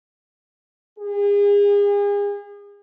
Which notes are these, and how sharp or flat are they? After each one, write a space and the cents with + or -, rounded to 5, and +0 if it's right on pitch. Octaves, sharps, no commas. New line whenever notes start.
G#4 -40